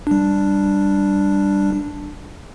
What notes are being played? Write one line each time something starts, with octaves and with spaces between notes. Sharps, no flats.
G3 D4